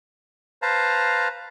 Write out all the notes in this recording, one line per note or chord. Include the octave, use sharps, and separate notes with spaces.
B4 C5 F5 A5 A#5